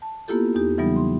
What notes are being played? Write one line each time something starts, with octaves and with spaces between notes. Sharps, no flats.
A5
A#3 B3 E4 F4 G4 A4
E2 D#4 G4
C#3 E3 F#3 G3 B3 D#4
C6